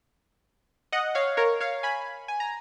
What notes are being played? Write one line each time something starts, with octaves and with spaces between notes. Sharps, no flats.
D#5 F#5
C#5 F5
A#4 C#5
C#5 F5
G#5 B5
G#5
A#5